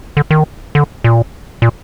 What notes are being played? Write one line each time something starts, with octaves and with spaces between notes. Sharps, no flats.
D3
D#3
D3
A#2
A#2